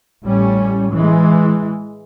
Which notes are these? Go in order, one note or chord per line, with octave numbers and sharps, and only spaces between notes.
A1 G3 C#4
E3 G#3